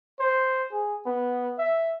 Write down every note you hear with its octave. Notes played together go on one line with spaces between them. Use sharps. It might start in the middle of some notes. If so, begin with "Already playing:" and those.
C5
G#4
B3
E5